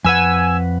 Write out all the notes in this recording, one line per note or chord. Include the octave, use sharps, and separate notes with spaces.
F2 B4 F#5 G#5 E6